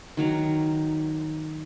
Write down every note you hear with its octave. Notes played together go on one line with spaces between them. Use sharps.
D#3 F#3 A#5